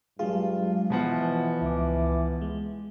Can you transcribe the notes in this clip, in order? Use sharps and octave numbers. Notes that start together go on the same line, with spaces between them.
G2 F#3 G#3 F4 G#4
B2 E3 F3 F#5
C#2 D6
G#3